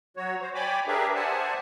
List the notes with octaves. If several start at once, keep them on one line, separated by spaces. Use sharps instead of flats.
F#3 F#4 C#5
C5
C#5 D5 G5 G#5 B5 D6
D4 G4 G#4 A#4 B4 E5
C5 D5 E5 F#5 G#5 A5